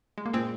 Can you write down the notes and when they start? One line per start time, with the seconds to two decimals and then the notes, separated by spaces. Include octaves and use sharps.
0.18 G#3
0.26 A#3
0.33 A#2 G#3 C4